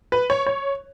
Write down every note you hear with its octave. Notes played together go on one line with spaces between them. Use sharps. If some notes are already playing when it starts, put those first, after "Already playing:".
B4
C#5
C#5